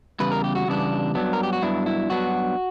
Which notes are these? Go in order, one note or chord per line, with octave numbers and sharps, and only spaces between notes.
E2 C#3 G3 B4
A#4
G4
F#4
E2 C#3 G3 B3 D4
G2 F#3 B3 D4
A#4
G4
F#4
G2 F#3 B3 D4 E4
E4
G2 F#3 B3 D4 F#4